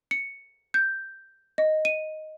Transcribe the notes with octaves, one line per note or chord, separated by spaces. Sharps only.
C#7
G6
D#5
D#7